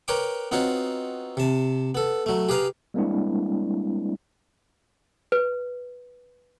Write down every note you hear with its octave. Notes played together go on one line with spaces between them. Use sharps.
A#4 B4 C#5 G5 D6
B3 C4 D#4 F4 F#4 C#5
C3 A5
B3 A4
F#3 A3
G4 G#4 B4 F5 A#5
G3 G#3 A#3 C4 D4 E4
B4